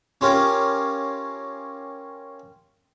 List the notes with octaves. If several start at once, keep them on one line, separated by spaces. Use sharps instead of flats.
C#4 F4 G4 A#4